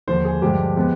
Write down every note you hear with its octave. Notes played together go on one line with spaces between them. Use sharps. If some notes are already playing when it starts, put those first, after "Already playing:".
D#2 D3 F3 C5
G#4
G2 D3 F3 G#3 G4
F3 G#3 B3